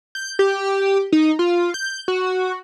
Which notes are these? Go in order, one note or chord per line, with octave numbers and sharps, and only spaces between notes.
G6
G4
D#4
F4
G6
F#4